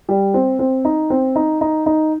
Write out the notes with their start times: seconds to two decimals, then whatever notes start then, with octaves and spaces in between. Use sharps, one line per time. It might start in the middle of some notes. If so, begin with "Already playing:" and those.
0.09 G3
0.34 C4
0.59 C4
0.85 D#4
1.10 C4
1.36 D#4
1.61 D#4
1.86 D#4